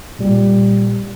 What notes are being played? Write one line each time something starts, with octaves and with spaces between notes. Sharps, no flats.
A#2 G3